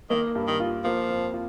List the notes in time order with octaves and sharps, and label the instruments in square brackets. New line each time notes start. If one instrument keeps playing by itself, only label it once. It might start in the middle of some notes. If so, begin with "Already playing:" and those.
[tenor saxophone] D#3 [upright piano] A#3
[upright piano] G2
[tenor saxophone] D#3
[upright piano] F4
[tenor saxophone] F3 [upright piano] A#3
[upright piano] F2
F4